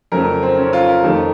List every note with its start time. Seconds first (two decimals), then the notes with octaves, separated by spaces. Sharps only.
0.12 F2 C#3 F#3 A3 A#4
0.43 C4
0.57 C#4
0.73 F4
0.89 A#4
1.04 F2 D#3 A3